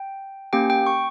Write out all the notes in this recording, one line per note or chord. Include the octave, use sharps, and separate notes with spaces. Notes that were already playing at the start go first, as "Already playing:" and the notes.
Already playing: G5
A#3 C#4 G4 G5
G5
C#6